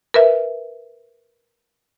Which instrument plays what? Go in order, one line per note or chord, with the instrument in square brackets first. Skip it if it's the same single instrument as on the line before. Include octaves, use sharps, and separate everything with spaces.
[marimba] A#4 B4 E5